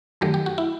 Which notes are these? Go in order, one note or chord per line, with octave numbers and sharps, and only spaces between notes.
F#2 D#3 F#3 A3 G4
G4
F#4
E4